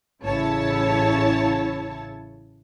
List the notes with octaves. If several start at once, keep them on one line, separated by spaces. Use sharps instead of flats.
A1 C#3 E4 C#5 A5